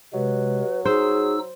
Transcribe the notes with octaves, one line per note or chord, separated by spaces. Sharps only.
C3 F#3 G#3 B4
D#4 G#4 C5 E6